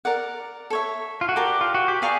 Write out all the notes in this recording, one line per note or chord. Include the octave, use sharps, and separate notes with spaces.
A#4 D5 F#5
A4 C#5 E5
F4
F#4
G4 A#4 D5 F#5 A5
F4
F#4
G4
G#4 D5 F5 A#5 C#6